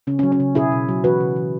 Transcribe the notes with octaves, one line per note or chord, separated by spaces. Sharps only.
C#3 C#4
C#4
F#3
C#4
C#3
B2 E4 G#4
B2
F#3
E3 F#4 B4
C#3
E3